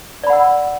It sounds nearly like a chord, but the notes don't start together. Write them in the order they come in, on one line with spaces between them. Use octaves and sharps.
D5 B5 F#5 E6